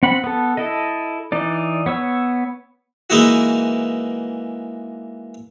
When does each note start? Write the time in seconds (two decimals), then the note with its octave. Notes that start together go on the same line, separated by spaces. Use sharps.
0.03 C4 F#5 B5
0.24 B3 A4
0.57 E4 A4 D#5
1.32 E3 D#4 D5
1.86 B3 C#5 E6
3.10 E3 G#3 A#3 D#4 E4 F#4